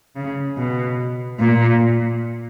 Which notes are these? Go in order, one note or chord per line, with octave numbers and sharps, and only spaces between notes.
C#3
B2
A#2